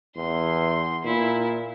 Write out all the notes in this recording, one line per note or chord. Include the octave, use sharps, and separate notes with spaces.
E2 C6
A#2 E4